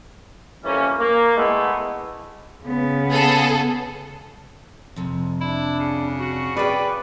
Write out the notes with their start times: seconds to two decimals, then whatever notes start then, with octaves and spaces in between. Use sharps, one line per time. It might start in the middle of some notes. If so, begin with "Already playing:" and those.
0.64 F2 E3 G3 A#3 C#4
0.99 A#3
1.37 G#3 A3 B3 E4
2.64 C#3 B3
3.09 G#4 A4
4.96 F2 C3
5.41 D4 E4
5.80 C#3
6.19 F#4
6.57 G#4 B4 D5 G5